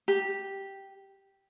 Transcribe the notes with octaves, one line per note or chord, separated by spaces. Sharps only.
G4